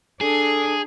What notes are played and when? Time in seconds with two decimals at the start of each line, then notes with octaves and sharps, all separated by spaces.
0.21 D4 G#4 A4